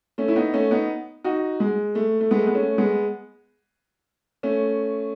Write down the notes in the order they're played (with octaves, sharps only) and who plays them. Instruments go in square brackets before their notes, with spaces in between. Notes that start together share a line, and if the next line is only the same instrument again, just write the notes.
[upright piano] A3 C#4
E4
B3 D#4
A3 C#4
B3 D#4
D#4 F#4
G#3
A3
A3
G#3 B3
A3
B3
A3 C#4
G#3 B3
A3 C#4